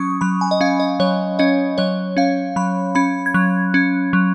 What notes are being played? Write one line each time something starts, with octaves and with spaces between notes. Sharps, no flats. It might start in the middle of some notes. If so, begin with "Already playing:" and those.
Already playing: F#3 C#4 C#6 D#6
F#3 B5
G#5
D#5
C#4 F5
D#5
F#3 C#5
C#4 D#5
F#3 C#5
C#4 F5
F#3 B5
C#4 B5
G#6
F#3 F#6
C#4
F#3